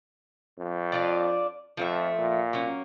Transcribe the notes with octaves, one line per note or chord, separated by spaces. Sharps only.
F2
D4 F4 D5
F2 F3 A3 E5
A#2
F#3 A#3 C#4